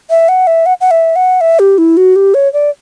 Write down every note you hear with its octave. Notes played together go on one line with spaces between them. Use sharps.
E5
F#5
E5
F#5
F#5
E5
F#5
E5
G4
E4
F#4
G4
C#5
D5